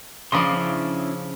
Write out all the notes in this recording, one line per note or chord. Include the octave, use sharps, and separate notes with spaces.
C#3 F3 D5 D#5 C6
C#4 D4 E4